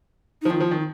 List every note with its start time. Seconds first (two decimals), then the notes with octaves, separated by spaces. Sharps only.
0.42 F3 D#4
0.50 D#3 F4
0.60 F3
0.71 D#3